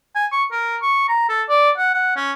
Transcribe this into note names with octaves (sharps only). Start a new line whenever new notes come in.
G#5
C#6
A#4
C#6
A#5
A4
D5
F#5
F#5
C#4